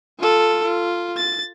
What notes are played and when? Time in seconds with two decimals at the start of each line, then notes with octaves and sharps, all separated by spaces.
0.19 F4 A4
0.64 F4
1.17 A6